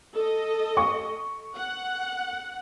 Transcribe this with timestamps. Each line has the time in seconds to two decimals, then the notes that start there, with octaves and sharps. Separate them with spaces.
0.15 A4 D#5
0.77 C#6
1.57 F#5